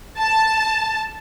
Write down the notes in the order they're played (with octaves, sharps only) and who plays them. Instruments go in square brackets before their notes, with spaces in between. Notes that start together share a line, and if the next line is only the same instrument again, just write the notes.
[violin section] A5